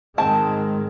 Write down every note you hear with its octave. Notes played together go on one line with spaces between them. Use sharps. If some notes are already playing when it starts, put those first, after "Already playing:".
G#2 D#3 G#3 C4 A5